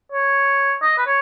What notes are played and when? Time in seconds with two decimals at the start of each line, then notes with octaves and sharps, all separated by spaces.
0.12 C#5
0.82 D#5
0.98 B4
1.06 C#5